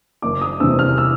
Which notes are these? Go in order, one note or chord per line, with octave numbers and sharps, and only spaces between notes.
F#1 D6
D#6
E2 C3 E6
F6
E6